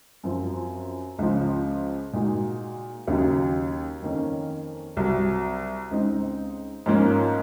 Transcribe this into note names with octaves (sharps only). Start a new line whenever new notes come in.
F#2 F3 C4
C#2 C#3 F3
A#2 G#3 D#4 F#4
D#2 C#3 F#3
F2 D#3 A#3 C#4
C2 C3 F#3
C#2 C#3 G#3 C4 D#4
G#2 F3 A#3 C#4